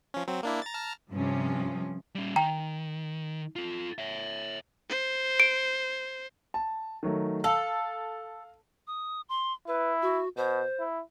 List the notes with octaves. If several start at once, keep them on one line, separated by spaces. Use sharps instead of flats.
F3 C#4
F#3 C4
A#3 D4 E4
A#5 A6
A5 A#5 F6
G2 C3 F3 C#4
G3 C#4
D#3 G5 A#5
F4 A4
C#5 E5
C5
D7
A5
D#3 F#3 A3
A4 F5
D#6
C6
E4 B4
F#4
B2 C5
E4